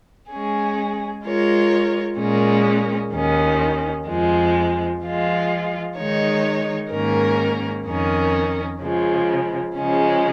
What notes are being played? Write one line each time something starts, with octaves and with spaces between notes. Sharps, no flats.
G#3 C#4 G#4
G#3 F4 A#4 C#5
A#2 G#3 C#4 A#4
D#2 D#3 C#4
F2 F3 G#3
F3 G#3 F4
D#3 G#3 D#4 C#5
G#2 D#3 A#3 C#4 A#4
F2 D#3 C#4 A#4
C#3 F3 G#3
C#3 F3 G#3 C#4